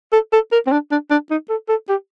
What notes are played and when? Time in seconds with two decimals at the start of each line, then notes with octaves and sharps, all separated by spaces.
0.12 A4
0.33 A4
0.52 A#4
0.67 C4
0.72 D4
0.91 D4
1.11 D4
1.30 D#4
1.49 A4
1.69 A4
1.89 G4